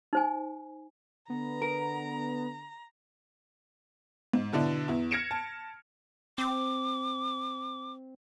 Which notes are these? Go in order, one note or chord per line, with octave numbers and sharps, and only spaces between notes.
D#4 C5 G#5
D3 B3 A#5
A#4
G#2
B2 D3 D4 E4
E2 E4
F6 G#6 A#6 C#7 D7 E7
A5
C4 D6